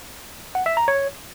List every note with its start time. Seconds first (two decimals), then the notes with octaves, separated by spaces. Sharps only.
0.55 F#5
0.66 E5
0.77 A#5
0.88 C#5